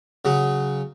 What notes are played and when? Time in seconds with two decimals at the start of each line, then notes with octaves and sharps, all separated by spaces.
0.25 C#3 F#3